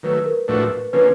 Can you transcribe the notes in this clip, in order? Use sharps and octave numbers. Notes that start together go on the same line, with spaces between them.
D#3 F#3 A3 B4
A#4
A2 F3 A3 D4 F#4 B4
D3 F3 A#3 C#4 B4